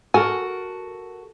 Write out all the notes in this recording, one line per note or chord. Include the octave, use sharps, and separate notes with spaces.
F#4 A4 A#4 G#5